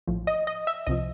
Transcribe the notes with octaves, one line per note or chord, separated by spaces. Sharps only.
A#1 A2 F3
D#5
D#5
E5
C2 C3 F3 D#5